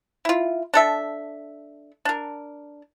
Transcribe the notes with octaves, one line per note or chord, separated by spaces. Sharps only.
E4 F4
D4 A4 E5
D4 A#4